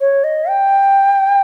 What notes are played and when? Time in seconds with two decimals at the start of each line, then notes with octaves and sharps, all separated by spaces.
0.01 C#5
0.24 D#5
0.49 G5